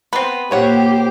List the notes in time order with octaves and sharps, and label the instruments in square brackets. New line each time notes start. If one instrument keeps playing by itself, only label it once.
[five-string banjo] B3 [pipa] C4 B4
[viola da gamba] A#2 C5 [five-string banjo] A#3 C#5 F#5 [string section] G4